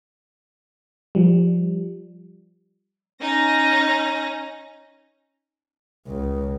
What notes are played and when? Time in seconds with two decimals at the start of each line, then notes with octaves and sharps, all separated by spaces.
1.15 F3 G3
3.20 C#4 D#4 A#6
6.08 C#2